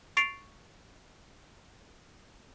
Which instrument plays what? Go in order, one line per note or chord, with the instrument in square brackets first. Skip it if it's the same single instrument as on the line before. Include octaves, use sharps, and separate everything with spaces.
[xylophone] C#6 A6 C7 D7 F7